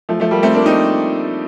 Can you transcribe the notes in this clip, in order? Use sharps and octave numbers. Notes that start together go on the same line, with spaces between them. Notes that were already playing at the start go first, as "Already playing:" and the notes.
F3 A3
F3 A3
G3 A#3
A3 C4
A#3 D4
C4 D#4